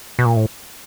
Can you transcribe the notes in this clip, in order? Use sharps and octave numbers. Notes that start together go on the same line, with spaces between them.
B2
A#2
A2